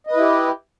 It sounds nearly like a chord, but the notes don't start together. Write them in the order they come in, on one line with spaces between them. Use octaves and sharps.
D#5 B4 E4 G4